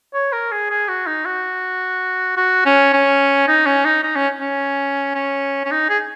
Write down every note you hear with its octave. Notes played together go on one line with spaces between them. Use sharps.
C#5
A#4
G#4
G#4
F#4
D#4
F#4
F#4
C#4
C#4
D#4
C#4
D#4
D#4
C#4
C#4
C#4
C#4
D#4
G#4